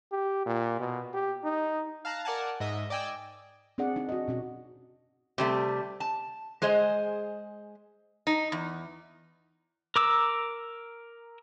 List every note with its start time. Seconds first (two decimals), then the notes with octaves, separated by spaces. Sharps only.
0.12 G4
0.46 A#2
0.79 B2
1.14 G4
1.44 D#4
2.05 F5 A5 A#5 F#6
2.25 A#4 D5 F#5 G#5 A5
2.60 G#2 D#5 E5
2.90 D5 D#5 G5 G#5 E6
3.78 C4 D4 G#4 D5 F#5
3.96 D4 D#4
4.09 F#4 D#5
4.28 B2 C#4 F#4
5.38 C3 G3 A3
6.00 A5
6.62 G#3 G#4 C5 D#5
8.27 D#4
8.52 E2
9.96 A#4 D6 E6